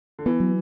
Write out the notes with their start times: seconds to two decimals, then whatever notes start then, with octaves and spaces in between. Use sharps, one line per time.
0.19 D3
0.26 E3 B3
0.40 F#3